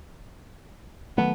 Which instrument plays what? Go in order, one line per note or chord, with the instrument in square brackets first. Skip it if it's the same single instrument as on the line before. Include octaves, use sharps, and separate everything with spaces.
[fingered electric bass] D#3 F#3 A3 [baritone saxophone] B3